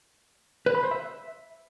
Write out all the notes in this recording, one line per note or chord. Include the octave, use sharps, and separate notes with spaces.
B4
B5
C5
E5